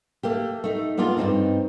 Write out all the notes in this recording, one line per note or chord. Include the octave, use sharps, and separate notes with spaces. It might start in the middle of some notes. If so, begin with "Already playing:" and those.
A3 A#3 G4
A3 D#4
A#3 B3 D4 F4 G#4 A#4
G2 A#2 C4 D#4